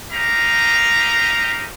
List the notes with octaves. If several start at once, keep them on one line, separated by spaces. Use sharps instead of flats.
D#4 G4 F5 A#5